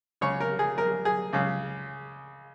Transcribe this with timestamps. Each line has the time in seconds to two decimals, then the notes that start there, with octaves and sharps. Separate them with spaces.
0.21 C#2 C#3 C#5
0.40 A#4
0.59 G#4
0.78 A#4
1.05 G#4
1.33 C#2 C#3